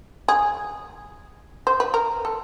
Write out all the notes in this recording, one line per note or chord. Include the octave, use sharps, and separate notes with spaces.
G#4
C5
B4
A#4
A4